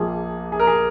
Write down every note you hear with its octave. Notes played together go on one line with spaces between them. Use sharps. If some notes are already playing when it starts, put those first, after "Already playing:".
Already playing: A#1 A#2 F3 G#4
G#4
A#4
G#4